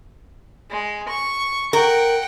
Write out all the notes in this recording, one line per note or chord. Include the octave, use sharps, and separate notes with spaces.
G#3
C#6
A#4 F#5 G5